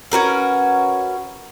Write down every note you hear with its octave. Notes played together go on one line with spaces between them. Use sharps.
C#4 F#4 A#4 B4